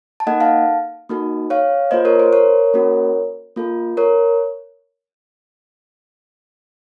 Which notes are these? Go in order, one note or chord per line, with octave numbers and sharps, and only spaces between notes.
A5
A#3 D#4 A4 D#5 F#5
F5 A5
A#3 D#4 F#4 A4
C#5 F5
A#3 F4 A4 C5 D#5
A#4 C#5
C5
A#4 C#5
A#3 C#4 F#4
A#3 F4 A4
A#4 C#5